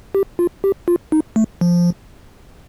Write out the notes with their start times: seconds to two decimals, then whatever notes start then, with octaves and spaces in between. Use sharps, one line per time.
0.15 G4
0.39 F4
0.64 G4
0.88 F4
1.12 D#4
1.36 A3
1.61 F3